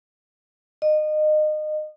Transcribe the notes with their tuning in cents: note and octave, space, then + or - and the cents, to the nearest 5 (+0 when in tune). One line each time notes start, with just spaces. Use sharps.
D#5 -25